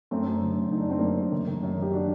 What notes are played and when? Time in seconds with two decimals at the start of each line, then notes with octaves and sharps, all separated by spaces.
0.11 F#2 A3 C4
0.26 F#2
0.41 D3
0.56 F#2
0.71 D3 D#4
0.80 D4
0.87 F#2 C4
0.99 F#2 A#3 D4
1.17 F#2
1.32 D#3
1.47 D#3
1.63 F#2
1.78 D#3 G4
1.93 D4 F#4